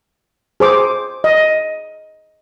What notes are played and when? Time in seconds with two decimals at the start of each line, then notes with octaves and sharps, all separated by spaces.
0.60 G#4 C5 D6
1.24 D#5